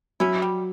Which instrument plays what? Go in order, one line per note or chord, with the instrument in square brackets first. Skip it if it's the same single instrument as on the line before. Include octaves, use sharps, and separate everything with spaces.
[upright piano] F#3 [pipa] C#4 E4
[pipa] G3